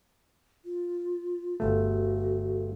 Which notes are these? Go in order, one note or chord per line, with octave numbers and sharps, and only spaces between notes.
F4
G1 A3 F#4